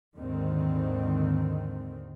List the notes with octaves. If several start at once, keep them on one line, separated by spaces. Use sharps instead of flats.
D#2 G#2 D3 D#3 C4